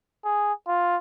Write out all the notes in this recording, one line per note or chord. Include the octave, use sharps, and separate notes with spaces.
G#4
F4